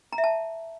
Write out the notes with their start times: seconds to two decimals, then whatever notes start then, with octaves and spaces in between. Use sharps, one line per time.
0.13 A#5
0.18 E5
0.24 A5